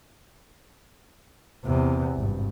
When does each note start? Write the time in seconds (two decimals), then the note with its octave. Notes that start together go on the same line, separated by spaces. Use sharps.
1.64 E2 C3
2.16 G#1 G2